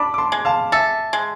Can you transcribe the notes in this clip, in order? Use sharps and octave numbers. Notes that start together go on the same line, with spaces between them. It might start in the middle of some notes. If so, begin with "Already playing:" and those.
Already playing: D4 B5 D6
D6
A5 C6
G#3
F5 A5
A4 E5 G#5
G#3